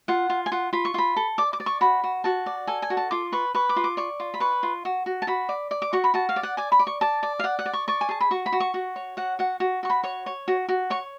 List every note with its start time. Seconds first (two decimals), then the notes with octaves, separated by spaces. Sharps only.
0.08 F4 F#5
0.30 F4
0.46 G#5
0.52 F4 F#5
0.73 F4 B5
0.85 C#6
0.94 F4 B5
1.17 A4
1.38 D5 D6
1.53 D6
1.60 D5
1.66 C#6
1.81 F#4 B5
2.04 F#4
2.24 F#4 A5
2.46 D5
2.67 A4 G#5
2.82 G#5
2.90 F#4
2.97 A5
3.11 F4 D6
3.32 B4 C#6
3.55 B4 C#6
3.69 D6
3.76 F4
3.84 D6
3.97 D5 C#6
4.20 F4
4.34 B5
4.40 B4 C#6
4.63 F4
4.85 F#4
5.06 F#4
5.22 A5
5.27 F#4 B5
5.49 D5
5.71 D5
5.82 D6
5.93 F#4 C#6
6.04 B5
6.14 F#4 A5
6.29 F5
6.36 D5
6.43 F#5
6.57 D5 G#5
6.72 B5
6.79 D5
6.87 C#6
7.01 D5 A5
7.23 D5
7.39 F5
7.44 D5 F#5
7.59 F#5
7.66 D5
7.73 C#6
7.88 D5 C#6
8.01 G#5
8.09 G#4 A5
8.21 B5
8.31 F#4 C#6
8.46 B5
8.53 F#4
8.60 C#6
8.74 F#4
8.96 C#5
9.17 F#4 F#5
9.39 F#4 F#5
9.60 F#4
9.83 F#4 C#6
9.90 B5
10.04 C#5 C#6
10.26 C#5
10.48 F#4
10.69 F#4
10.90 C#5 C#6